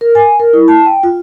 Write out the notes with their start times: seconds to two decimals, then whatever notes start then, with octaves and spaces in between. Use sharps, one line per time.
0.01 A#4
0.15 G#5
0.40 A#4
0.53 E4
0.68 A5
0.86 G5
1.03 F4